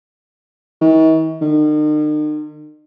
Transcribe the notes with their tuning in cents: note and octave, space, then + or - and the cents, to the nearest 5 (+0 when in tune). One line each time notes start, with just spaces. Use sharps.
D#3 +45
D#3 -45